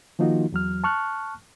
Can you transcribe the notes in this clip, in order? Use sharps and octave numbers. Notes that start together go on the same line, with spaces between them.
D#3 F3 A#3 D#4 F4 F#4
E2 F#3 F6
A5 C#6 F6 F#6